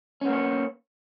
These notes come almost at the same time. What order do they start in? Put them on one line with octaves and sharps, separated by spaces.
C#4 B3 A#3 C#5